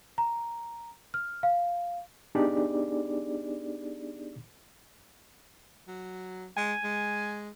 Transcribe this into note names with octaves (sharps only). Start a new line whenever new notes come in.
A#5
F6
F5
B3 D4 D#4 G4 G#4 D5
F#3
G#3 G#5
G#3